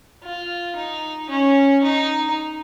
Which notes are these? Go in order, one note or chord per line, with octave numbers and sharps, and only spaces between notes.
F4
D#4
C#4
D#4